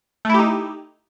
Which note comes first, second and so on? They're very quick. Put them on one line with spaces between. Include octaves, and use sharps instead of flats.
A3 E4 G4 D#4